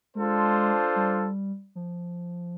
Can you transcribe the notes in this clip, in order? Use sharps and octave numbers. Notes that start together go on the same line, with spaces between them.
G#3 D4 F4 A4 C5
G3
F3